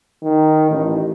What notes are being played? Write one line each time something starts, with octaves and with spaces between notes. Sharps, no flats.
D#3
A1